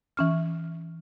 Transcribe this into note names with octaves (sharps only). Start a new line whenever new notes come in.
E3 C#4 F6